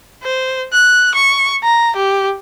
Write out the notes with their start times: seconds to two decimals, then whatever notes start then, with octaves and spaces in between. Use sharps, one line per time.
0.24 C5
0.73 F#6
1.15 C#6
1.64 A#5
1.96 G4